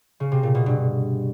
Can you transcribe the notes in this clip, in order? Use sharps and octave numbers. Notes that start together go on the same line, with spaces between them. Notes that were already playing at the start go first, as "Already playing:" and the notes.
C#3
C3
A#2
B2
G2